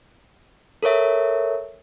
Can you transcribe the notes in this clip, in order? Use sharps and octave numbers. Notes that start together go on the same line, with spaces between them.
A4 A#4 C#5 E5